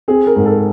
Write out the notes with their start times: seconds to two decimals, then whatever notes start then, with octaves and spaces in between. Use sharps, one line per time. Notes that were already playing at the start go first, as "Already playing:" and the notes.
0.08 C4 G#4
0.27 A#4
0.36 G#2
0.46 A4